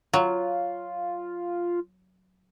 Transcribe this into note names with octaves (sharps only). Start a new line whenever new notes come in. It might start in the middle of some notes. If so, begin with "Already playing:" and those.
F#3 F4